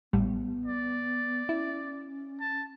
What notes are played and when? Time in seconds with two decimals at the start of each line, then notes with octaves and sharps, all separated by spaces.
0.13 A1 A2 G3 B3
0.66 D5
1.49 C#4 E4
2.40 A5